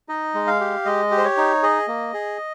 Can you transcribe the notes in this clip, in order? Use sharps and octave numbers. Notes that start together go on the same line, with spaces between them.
D#4 D#5
G#3
F5
G4
G#3 D#5
G4
C5
C#5
D#4
G#4 D#5
A#3
G#4